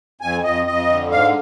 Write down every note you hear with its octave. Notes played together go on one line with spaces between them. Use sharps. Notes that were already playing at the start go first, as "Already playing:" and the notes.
F2 G#5
F2 D#5
F2 D#5
D3
G#2 F5